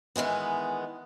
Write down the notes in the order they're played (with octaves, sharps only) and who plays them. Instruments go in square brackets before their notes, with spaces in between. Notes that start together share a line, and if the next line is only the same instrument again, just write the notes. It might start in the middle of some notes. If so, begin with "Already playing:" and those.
[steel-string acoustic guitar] D#3 E3 G#3 B3